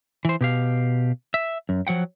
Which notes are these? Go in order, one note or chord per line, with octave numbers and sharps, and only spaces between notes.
E3 C5
B2 G4 F5
E5
F#2
F3 F#3 F#5 G5